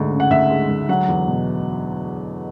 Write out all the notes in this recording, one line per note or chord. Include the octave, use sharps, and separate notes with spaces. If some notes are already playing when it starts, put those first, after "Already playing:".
Already playing: D2 G#2 G#3
C#3
F#5
D2 E5
G#3
D2
F#3 F#5
E2
B2